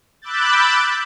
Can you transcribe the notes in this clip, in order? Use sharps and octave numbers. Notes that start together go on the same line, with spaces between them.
B5 D6 E6 F#6 G6 A6